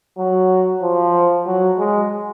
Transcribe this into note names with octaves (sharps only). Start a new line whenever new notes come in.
F#3
F3
F#3
G#3